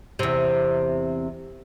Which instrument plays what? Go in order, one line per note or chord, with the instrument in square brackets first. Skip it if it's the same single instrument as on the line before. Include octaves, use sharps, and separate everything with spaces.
[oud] E2 C3